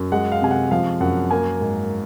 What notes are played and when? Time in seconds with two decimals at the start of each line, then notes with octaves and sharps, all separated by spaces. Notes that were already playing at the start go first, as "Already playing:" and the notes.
Already playing: F#2
0.12 G#3 F#5
0.32 F5
0.42 C3 G#5
0.51 F#5
0.71 F3 F5
1.00 F#2 F#5
1.31 A#3 G#5
1.61 G#2